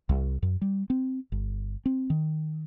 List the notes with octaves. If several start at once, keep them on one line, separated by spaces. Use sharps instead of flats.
C2
F#2
G3
C4
G1
C4
D#3